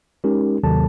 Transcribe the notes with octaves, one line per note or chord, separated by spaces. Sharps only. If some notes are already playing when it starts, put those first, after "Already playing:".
G#3 C#4 D#4 G4 A#4
D#2 C3 D#3 F#3 A4 A5